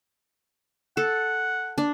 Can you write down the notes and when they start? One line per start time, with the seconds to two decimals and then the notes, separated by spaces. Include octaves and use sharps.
0.97 A4 F#5
1.78 D4